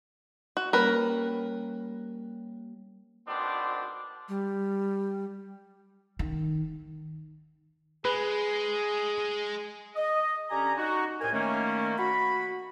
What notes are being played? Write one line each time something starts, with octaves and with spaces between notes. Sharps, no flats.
F#4
G3 A#3 C#4 A#4 B4
G#1 B2 C4 D4 C5
G3
D#3
G#3 G#4 B4
D#5
D3 C#4 G4 G#5 A#5
D#4 F#4
C2 A2 A#4 C5 G#5
D#3 A3 A#3 C#4
F#4 B5